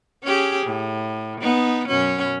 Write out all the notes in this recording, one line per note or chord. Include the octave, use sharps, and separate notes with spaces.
C#4 G4 G#4
A2
B3 D#4
F#2 B2 C#4